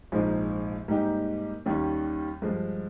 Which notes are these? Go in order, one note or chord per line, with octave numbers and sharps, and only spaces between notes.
A#1 G#2 F3 G#3 D#4
G#2 G3 A#3 D#4 G4
D#2 D#3 G3 C#4
G2 F3 G#3